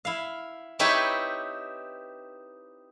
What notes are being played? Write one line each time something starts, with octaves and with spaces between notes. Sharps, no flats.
E4 F5
C4 D#4 E4 G4 B4 C#5